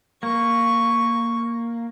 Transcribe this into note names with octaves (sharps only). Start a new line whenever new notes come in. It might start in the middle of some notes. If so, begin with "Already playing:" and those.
A#3 C#6